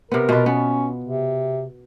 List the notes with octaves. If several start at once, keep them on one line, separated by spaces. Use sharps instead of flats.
C3 B3 A#4
B2 F4 B4
B3 C#4
C3